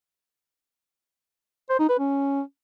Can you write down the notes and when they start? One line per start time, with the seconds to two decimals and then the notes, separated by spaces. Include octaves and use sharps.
1.70 C5
1.80 D#4
1.89 B4
1.99 C#4